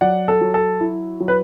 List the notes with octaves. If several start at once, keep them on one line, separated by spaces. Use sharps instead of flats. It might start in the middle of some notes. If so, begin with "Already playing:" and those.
F#3 D5 F#5
A4
F#3
A4
E4
F#3
B4